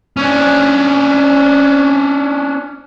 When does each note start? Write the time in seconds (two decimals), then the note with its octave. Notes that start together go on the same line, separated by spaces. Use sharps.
0.17 C#4 D4